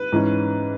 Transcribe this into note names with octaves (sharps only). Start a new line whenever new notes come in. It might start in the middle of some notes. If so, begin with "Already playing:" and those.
Already playing: B4
G#2 E3 C#4